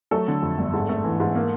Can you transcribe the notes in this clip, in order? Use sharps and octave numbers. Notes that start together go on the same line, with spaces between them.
F#3 A3 A4
D3
F2
G1
G#2
A3
E3
G#2
A#3